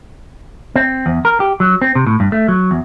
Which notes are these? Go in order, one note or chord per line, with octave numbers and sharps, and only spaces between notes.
C4
E2
A#4
G4
F#3
C4
C3
A2
G2
A3
F#3
E2